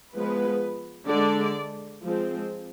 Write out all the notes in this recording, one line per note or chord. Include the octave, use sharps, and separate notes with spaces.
F3 G#3 B3 B4
D3 G#3 D4 D5
F3 G#3 C4